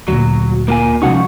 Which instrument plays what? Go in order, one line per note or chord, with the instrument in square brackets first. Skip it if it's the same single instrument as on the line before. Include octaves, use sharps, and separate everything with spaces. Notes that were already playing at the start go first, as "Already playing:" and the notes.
[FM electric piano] D2 A#2 [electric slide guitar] F#3
[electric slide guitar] A#3 F4 G#5
[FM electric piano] C2 F#4 C#6 [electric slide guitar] F3 C#4 D#4